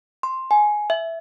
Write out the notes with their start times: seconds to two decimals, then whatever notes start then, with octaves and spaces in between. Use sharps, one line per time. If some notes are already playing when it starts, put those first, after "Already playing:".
0.23 C6
0.51 G#5
0.90 E5